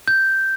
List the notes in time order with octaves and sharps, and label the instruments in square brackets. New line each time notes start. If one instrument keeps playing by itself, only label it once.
[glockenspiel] G6